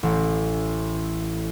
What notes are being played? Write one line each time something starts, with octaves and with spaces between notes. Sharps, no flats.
A1